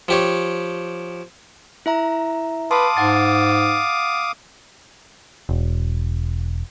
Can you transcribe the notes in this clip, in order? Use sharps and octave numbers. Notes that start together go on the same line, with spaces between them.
F3 G4 C#5
E4 E5 A#5
B4 F5 A5 C6 D6 D#6
G#2 F#5 A6
E1